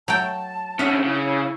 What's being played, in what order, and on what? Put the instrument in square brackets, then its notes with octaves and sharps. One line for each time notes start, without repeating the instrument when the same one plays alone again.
[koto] F#3 A3 G5 [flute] A5
[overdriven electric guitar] D3 C#4 [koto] E5 F#5
[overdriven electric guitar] C#3 [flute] E4